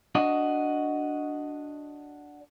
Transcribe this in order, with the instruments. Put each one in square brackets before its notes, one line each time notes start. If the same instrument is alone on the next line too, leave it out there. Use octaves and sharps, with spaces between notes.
[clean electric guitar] D4 F#4 D#5